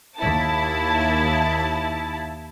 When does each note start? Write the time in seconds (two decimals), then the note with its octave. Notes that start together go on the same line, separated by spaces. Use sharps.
0.17 D#2 E4 A5